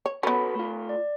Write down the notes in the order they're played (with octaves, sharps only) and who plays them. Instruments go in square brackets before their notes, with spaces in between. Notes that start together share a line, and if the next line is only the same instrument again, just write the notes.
[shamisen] C#5
[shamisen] B3 C#4 [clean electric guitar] F#4 A4 B4 [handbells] B5
[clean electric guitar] A3 F4
[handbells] D5